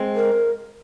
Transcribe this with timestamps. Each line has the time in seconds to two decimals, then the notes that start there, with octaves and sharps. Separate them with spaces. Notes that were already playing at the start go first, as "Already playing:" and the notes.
Already playing: G#3 C4
0.16 A#4